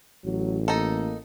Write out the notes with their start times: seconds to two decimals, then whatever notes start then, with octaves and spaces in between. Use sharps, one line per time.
0.25 A1 F#3
0.68 A#3 D#4 A4